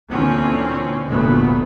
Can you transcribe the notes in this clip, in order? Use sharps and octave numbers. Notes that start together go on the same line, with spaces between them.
D2 A#2 D3 E3 C4 C#4
F1 D2 A#2 A3 B3